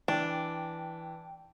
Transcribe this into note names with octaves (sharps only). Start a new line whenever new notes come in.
E3 D4 G5